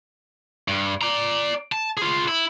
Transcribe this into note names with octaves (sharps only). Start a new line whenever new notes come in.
G2
D5 A#5
A5
F4 G#4
E4